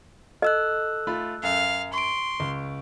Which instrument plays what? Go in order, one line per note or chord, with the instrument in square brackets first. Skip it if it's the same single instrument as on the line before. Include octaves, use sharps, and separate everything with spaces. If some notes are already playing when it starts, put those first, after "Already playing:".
[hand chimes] A4 E6 F#6 [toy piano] D#5
[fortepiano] A3 F4 B5
[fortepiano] F#2 [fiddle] F5
[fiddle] C6 [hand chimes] C#6 D7
[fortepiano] C#2